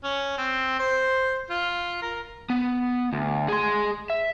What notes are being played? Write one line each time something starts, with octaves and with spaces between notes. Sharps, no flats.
C#4
C4
C5
F4
A#4
B3
D2
G#4 C6
E5